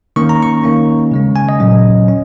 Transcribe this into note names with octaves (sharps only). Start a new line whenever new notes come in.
D#3 A#3 C#4 C#6
A#5
C#6
D#3 A#3 C#4
C#3 G#3 C#4
G#5
D#5
A#2 F#3 C#4
C#4